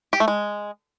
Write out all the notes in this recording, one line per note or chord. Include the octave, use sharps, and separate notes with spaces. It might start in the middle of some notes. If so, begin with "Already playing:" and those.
G4
A3
G#3